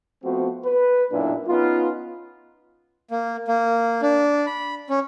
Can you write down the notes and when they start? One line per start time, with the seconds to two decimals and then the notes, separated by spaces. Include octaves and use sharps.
0.24 F3 A3 B3 C4 F#4
0.65 B4
1.12 B1 F#2 A#2 D4 E4
1.48 B3 C#4 D#4 F4
3.11 A#3
3.48 A#3
4.02 D4
4.47 B5
4.90 C#4